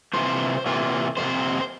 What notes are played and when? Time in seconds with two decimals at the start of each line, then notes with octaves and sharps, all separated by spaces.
0.13 C3 E3 A#3 F4 C5
0.66 C3 E3 A#3 F4
1.17 F2 C3 A#3 C5